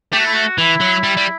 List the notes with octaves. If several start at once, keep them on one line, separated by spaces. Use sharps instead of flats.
A3 G4
F#4
E4
F#4
E3 E4
F#3
G3
G3